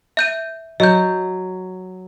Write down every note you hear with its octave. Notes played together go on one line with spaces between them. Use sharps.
E5 G6 D#7
F#3 D#5 G6